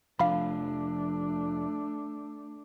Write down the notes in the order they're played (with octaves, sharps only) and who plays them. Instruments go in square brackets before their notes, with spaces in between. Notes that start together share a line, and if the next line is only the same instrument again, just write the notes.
[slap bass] F1 F3 [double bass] A3 D4 [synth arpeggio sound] F5 B5